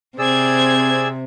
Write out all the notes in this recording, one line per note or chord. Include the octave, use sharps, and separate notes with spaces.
C3 C4 G#4 D5 E6 G#6